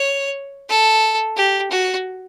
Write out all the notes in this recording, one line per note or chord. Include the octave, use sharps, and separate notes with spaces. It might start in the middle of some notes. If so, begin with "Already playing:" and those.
Already playing: C#5
A4
G4
F#4